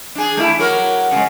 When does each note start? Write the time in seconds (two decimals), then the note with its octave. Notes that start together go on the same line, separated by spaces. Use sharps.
0.15 D4 G#4
0.37 A3 E4
0.59 F#3 F#4 A#4
1.11 C#3 G#3